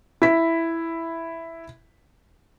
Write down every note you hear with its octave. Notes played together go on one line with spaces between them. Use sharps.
E4 B6